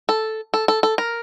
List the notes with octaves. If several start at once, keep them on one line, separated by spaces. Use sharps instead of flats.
A4
A4
A4
A4
A#4